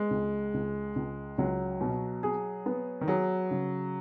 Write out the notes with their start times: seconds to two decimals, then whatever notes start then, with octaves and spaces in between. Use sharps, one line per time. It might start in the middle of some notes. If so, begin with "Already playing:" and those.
Already playing: G#3 B3
0.11 C#2
0.54 C#2
0.96 C#2
1.38 C#2 F#3
1.81 B2
2.23 G#4
2.66 B3
3.01 D#3
3.08 F#3 G#4
3.51 C#3